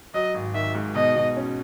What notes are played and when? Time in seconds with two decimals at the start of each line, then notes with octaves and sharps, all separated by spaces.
0.14 F#3 D#5
0.34 G#1
0.54 D#3 E5
0.75 G#2
0.95 B2 D#5
1.16 B2
1.37 C#4